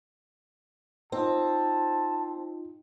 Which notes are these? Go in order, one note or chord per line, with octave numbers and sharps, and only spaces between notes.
C4 D#4 F4 A5